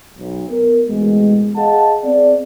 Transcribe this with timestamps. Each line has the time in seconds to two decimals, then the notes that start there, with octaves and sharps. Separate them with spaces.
0.18 B1
0.50 B3 A#4
0.88 A1 B2 G#3
1.57 G#4 D#5 F5 F#5 A5
2.03 C4 G#4 D5